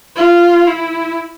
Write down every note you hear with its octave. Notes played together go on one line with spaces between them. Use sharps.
F4
E4